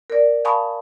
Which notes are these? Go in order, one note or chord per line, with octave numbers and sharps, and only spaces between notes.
A#4 D5
F5 G#5 A5 B5 C#6 D#6